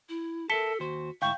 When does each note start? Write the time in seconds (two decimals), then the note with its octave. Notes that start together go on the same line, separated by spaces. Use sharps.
0.09 E4
0.50 A4 A#4 E5 A5 B6 C#7 G7
0.80 D#2 F#4 C5
1.22 D2 G#2 E4 F5 G5 C#6 G6